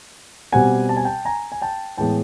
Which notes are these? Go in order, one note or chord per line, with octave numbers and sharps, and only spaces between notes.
B2 G3 C4 F#5 G#5
A5
G#5
G5 A5
G#5 A#5
G#5
G5 A5
A2 E3 G#3 B3 G5 A5